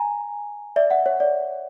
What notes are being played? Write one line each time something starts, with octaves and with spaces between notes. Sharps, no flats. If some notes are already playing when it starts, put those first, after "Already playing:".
Already playing: G#5 A#5
D5 E5
E5 F#5
C#5
D5